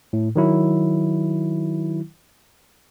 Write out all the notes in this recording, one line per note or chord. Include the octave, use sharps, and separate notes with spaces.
A2
D#3 F#3 E4